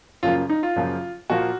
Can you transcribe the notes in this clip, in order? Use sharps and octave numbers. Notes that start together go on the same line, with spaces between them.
F#2 C#3 F3 A#3 F4
D#4
F4
F#2 C#3 F3 A#3
A#2 F3 A#3 F#4